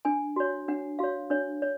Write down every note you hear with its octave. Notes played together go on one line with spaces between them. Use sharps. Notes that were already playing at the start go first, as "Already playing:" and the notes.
D4 G#5
F#4 C#5
D4 F#5
F#4 C#5 F5
D4 C#5
C#5